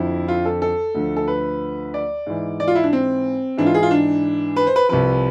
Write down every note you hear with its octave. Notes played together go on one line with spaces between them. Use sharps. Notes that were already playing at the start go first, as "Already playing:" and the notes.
Already playing: F2 D3 F3 E4
F4
A4
A4
D2 D3 F3
A4
B4
D5
G#2 E3
D5
F4
E4
D4
C4
G#2 E3 D4
F4
G#4
F4
D4
B4
C5
B4
C2 C3 F3 B4